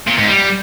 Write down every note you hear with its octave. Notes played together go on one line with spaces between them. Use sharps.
A#2
G#2
G3